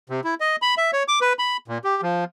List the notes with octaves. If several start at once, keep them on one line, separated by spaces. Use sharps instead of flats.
C3
E4
D#5
B5
E5
C#5
D6
B4
B5
A#2
G4
F3